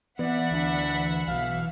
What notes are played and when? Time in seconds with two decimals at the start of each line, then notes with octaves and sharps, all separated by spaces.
0.19 E3 B3 D5 E5 F#5 B5
0.51 D2 D4
1.27 B1 B2 F5